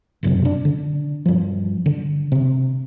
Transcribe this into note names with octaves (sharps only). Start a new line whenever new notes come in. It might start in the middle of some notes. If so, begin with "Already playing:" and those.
F#1 B1 F#2 C3
D4
D3
G2 F3
D3
C3